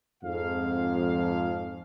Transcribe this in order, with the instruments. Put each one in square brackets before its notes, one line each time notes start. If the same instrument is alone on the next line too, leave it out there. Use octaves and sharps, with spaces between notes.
[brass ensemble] F2 G#2 F3 F5